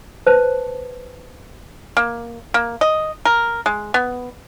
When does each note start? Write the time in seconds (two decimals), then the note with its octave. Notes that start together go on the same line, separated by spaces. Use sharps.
0.27 B4 C5 A5
1.97 A#3
2.54 A#3
2.81 D#5
3.25 A#4
3.66 G#3
3.94 B3